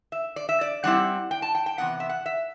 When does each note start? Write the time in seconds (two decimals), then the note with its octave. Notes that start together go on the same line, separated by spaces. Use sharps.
0.12 E5
0.36 D5
0.49 E5
0.61 D5
0.84 A2 G3 C4 E4 F#5
1.31 G5
1.42 A5
1.55 G5
1.66 G5
1.78 C3 E3 B3 F#5
2.00 E5
2.09 F#5
2.26 E5